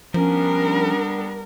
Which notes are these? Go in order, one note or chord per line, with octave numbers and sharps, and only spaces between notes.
F3 G3 B3 C#4 D4 A#4